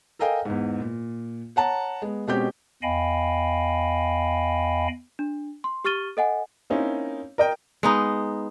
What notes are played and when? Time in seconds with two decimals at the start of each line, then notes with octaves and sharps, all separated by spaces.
0.19 A4 A#4 D#5 F5 G5 G#5
0.45 E2 G#2
0.80 A#2
1.56 C#5 F#5 A5 A#5
2.02 G#3 B3
2.27 B2 G#3 C4 C#4 G4 G6
2.83 E2 D#5 F5 G5 G#5 B5
5.19 D4
5.64 C6
5.85 G4 C#6 F6 A6 D#7 G7
6.17 A4 D#5 F#5 G#5
6.70 A#3 C4 C#4 D#4 E4
7.38 A#4 D#5 G5
7.83 G#3 B3 D#4